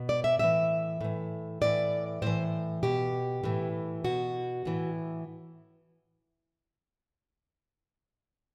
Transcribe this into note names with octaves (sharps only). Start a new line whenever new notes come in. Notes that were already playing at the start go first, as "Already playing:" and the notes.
Already playing: B2
D5
E5
A2 E3 E5
A2 E3
A2 E3 D5
A2 E3 C5
B2 G4
A2 E3
B2 F#4
A2 E3